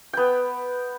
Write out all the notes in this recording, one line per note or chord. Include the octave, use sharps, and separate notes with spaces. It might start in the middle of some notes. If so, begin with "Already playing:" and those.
B3 G5